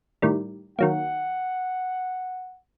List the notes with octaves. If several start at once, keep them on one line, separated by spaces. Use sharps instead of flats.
A2 D#3 G3
D#3 F#3 A#3 F#5